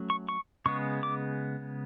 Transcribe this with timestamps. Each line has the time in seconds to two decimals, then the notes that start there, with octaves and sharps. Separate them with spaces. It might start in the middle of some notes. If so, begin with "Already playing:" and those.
Already playing: F#3 A3 C#4
0.10 C#6
0.29 C#6
0.66 C#3 G#3 B3 C#6
1.03 D6